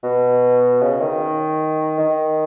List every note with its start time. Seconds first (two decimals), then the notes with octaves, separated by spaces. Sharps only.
0.03 B2
0.82 C#3
1.01 D#3
1.99 D#3